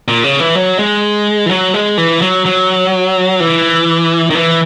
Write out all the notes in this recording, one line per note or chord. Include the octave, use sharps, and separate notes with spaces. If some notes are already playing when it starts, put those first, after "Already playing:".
A#2
C#3
E3
F#3
G#3
E3
F#3
G#3
E3
F#3
F#3
E3
D#3
E3